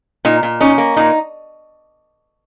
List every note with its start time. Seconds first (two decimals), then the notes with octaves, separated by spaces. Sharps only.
0.25 A#2 D#4
0.43 A#2
0.60 C#4 D#4
0.78 A#3
0.97 A#2 D#4